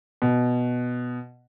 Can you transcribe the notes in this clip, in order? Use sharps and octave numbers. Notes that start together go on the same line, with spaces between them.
B2